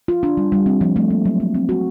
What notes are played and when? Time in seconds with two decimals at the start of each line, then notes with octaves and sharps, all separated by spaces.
0.08 F4
0.23 D4
0.37 G3
0.52 G3
0.66 C4
0.81 F3
0.96 A3
1.10 A#3
1.26 F#3
1.40 A#3
1.54 C4
1.69 F#4